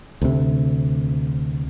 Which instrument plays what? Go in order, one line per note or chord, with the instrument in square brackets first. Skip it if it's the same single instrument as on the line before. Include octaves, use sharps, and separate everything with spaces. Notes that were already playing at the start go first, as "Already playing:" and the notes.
[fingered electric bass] D2 C3